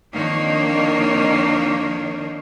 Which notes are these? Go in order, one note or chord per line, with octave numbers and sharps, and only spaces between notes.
F2 D#3 A#3 D4 D#4 C#5